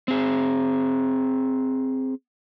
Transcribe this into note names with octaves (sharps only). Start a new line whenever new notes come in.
C4 G#4